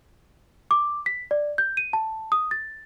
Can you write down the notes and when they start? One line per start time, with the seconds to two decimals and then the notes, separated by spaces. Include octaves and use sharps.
0.71 D6
1.06 B6
1.31 D5
1.58 G6
1.77 D#7
1.93 A5
2.32 D#6
2.51 A6